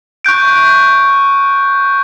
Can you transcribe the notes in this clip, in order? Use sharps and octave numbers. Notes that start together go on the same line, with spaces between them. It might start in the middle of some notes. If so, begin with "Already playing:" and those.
C#6 F#6 G6 D7